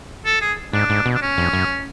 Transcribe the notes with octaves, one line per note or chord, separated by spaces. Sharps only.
A4
G#4
G#2 D4
G#2
B2
D4
C#4
F2
F#2